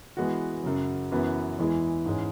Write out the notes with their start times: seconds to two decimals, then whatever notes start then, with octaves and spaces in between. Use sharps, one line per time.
0.17 E3 G#3 B3 F#4
0.63 F#2 C#3 F#3
1.12 F#2 E3 B3 F#4
1.59 E2 E3 G#3 E4 G#4
2.06 G#2 E3 G#3 C#4